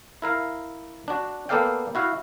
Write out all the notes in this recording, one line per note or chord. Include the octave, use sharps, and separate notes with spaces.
E4 A#4 F5
D4 F#4
A#3 B3 A4 D5 F5 G5
E4 F#4 F5